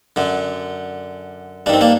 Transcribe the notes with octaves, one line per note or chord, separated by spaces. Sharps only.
F#2 D3
G2 D#3 C4 D4
A#3 D4